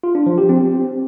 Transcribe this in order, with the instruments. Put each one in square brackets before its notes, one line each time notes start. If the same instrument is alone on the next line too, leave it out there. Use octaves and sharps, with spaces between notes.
[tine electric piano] F4
D4
F3
G4
C4